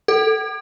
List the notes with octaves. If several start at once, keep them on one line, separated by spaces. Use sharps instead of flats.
A4